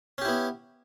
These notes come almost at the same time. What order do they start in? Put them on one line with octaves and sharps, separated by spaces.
C#4 G4 E4 B3